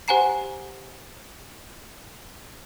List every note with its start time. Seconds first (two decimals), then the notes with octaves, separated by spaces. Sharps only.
0.08 G4 C5 F#5 G#5 A#5 C7